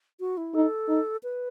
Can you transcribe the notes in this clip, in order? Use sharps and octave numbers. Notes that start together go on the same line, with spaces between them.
F#4
E4
D#4 A4
D#4
B4